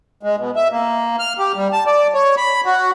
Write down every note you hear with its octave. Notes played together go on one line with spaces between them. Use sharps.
G#3
B2
E5
A#3
F6
G4
G3
A5
D5
C#5
B5
F#4